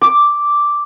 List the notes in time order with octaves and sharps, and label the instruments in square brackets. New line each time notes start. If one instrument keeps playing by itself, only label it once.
[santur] D6